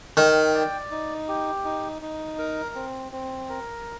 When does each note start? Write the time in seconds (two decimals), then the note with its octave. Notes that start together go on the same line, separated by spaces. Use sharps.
0.17 D#3 G5
0.54 D5
0.91 D#4
1.28 G4
1.65 D#4
2.02 D#4
2.39 A#4
2.75 C4
3.12 C4
3.50 A#4